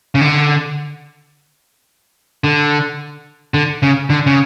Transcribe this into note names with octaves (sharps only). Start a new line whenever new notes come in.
C#3
D3
D3
D3
C#3
D3
C#3